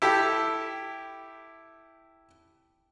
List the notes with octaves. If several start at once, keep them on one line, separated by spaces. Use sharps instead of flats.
E4 G4 A4 G5